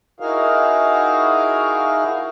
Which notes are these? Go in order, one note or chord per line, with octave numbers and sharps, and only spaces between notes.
D#4 E4 F#4 G#4 A#4 F5